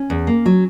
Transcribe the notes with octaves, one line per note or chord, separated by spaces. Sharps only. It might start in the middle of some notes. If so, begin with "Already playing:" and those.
Already playing: C#4
E2
A#3
F#3